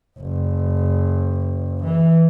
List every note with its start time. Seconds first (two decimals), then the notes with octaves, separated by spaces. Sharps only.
0.19 F#1
1.84 E3